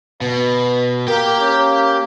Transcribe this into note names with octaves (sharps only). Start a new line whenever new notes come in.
B2 B4
A#3 G4 A#4 G5
C#4